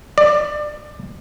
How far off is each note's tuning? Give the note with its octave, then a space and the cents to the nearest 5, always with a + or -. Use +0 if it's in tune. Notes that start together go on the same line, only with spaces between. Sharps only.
D5 +20